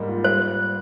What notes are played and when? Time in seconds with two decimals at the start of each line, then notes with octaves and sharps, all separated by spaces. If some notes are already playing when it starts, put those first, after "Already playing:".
Already playing: G#2 G3 A#3
0.08 F4
0.24 G3 C5